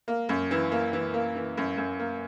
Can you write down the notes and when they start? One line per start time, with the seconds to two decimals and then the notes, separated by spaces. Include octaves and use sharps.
0.08 A#3
0.29 F#2
0.51 E3
0.72 A#3
0.93 E3
1.14 A#3
1.35 E3
1.57 F#2
1.78 F#2
1.99 A#3